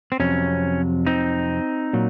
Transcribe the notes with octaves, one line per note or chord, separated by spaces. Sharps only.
C4
F2 C3 F#3 C#4
C4 D#4
A#2 F#3